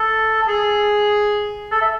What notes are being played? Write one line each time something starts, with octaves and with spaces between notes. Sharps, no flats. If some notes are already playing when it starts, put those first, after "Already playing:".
Already playing: A4
A4
G#4
A4
E5